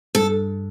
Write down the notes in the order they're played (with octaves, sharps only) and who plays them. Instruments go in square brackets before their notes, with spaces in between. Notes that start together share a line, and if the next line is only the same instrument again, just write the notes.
[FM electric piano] G2 [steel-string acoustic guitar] A4